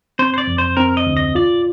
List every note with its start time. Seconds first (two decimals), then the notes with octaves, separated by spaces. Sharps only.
0.19 C4 C5
0.34 C5
0.38 D5
0.47 F2
0.58 C5
0.77 C4 A#4
0.97 D#5
1.07 D2
1.17 D#5
1.35 F4 D5